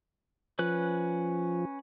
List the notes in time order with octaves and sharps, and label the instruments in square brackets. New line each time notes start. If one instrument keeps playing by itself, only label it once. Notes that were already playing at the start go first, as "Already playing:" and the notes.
[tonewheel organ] F3 [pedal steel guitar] C#4 B4 F#6